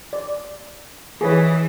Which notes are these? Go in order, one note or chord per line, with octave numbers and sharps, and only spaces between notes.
D5
E3 G#4 B4 C#5